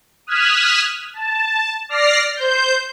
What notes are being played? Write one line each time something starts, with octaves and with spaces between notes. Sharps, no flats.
D#6 F6 F#6 G#6 B6 E7
A5
D5 F6 A#6 C7
C5 G6